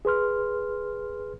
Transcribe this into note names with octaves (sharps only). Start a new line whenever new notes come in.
G#4 B4 C6 F6